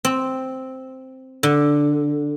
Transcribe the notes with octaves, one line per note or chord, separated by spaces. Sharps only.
C4
D3